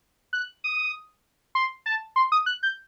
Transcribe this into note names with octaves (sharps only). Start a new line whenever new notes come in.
F#6
D#6
C6
A5
C6
D#6
F#6
G6